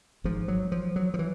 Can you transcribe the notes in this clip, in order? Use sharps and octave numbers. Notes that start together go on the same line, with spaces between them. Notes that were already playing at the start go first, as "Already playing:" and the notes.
G#1 G#2 F3
F#3
F3
F#3
F3
E3